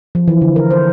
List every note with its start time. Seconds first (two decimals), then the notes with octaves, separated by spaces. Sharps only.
0.15 F3
0.28 E3
0.42 D3
0.56 A#4
0.71 C5